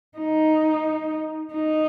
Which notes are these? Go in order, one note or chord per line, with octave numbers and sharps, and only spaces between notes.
D#4
D#4